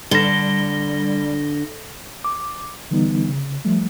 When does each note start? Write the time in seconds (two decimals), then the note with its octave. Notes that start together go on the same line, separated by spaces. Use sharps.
0.11 D3 G3 A#6 G7
2.24 D6
2.91 D3 E3 G3 B3 D#4
3.29 C#3
3.65 F3 G3 A3